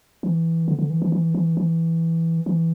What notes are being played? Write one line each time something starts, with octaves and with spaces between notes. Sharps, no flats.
E3
D3
D3
E3
E3
E3
E3
E3
E3